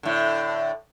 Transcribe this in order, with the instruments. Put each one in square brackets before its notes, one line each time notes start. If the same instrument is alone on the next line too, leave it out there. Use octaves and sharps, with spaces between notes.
[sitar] A2 D3